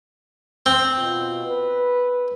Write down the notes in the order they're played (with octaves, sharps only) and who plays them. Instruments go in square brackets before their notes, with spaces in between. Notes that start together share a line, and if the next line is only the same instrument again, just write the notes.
[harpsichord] C4
[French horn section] B2 F4
B4